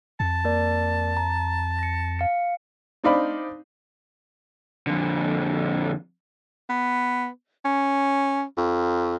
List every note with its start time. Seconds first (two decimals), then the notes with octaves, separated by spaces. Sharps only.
0.20 F2 A5
0.45 A#3 A#4 D5
1.17 A#5
1.79 A#6 C#7
2.19 F5 C#7
3.04 C4 D4 D#4 D5 F5 B5
4.87 F2 D3
6.70 B3
7.65 C#4
8.58 F2